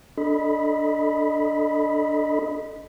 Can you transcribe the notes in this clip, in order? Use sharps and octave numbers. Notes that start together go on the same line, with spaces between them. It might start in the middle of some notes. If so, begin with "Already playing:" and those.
D4 A4 D#5 B5